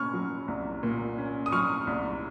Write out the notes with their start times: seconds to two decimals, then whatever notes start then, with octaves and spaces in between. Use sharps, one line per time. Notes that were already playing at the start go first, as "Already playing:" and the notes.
Already playing: A#2 C#4 C#6 F6
0.14 F#3
0.48 C2
0.83 A#2
1.18 C#4
1.46 D#6
1.52 F#3 C#6 F6
1.87 C2